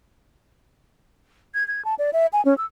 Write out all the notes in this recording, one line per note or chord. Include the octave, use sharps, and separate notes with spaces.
G#6
G#6
A5
D5
E5
G#5
C#4
E6